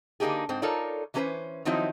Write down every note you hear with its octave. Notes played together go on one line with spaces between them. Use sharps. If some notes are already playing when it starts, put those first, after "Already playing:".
D3 A#3 C#4 D#4 G4 G#4
G#2 C4
D#4 F4 A4 A#4 C#5 D5
E3 F#3 C#4 A4 B4 C5
D#3 F3 F#3 C4 D#4 E4